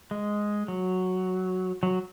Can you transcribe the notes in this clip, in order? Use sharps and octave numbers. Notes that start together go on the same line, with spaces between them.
G#3
F#3
F#3